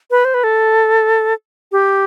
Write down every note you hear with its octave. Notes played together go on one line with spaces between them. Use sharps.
B4
C5
B4
A4
G4